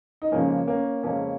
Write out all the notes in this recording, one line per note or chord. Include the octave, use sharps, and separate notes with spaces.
D#4
F2 C#3 F3 G#3 A#3 C#4
A#3 C#4
F2 C#3 F3 G#3 A#3 C#4